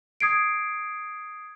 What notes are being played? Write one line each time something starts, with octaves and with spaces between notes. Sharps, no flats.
D#6 G#6 C7 D7